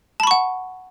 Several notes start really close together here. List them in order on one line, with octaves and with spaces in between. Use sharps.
A5 B5 C#6 F#5